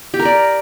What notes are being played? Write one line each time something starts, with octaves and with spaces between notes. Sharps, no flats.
G4
A#4
D5